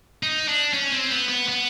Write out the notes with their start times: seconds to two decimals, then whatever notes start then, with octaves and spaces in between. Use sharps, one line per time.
0.23 D#4
0.48 D4
0.73 C#4
0.92 C4
1.10 B3
1.29 B3
1.49 B3